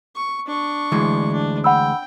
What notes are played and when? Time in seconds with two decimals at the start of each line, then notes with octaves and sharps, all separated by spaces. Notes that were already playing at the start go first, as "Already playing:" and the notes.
0.16 C#6
0.46 D4 C#6
0.92 D2 E3 G#3
1.32 D4
1.64 F#5 G5 B5 E6